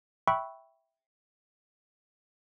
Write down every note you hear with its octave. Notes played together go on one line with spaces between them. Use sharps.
E5 G5 B5 C#6 E6 F#6